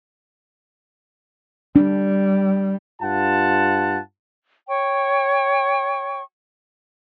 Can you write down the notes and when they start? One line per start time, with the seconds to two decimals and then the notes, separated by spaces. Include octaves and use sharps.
1.76 G3 D4
3.02 G2 F4 F#5 A5
4.68 C#5 G5 C#6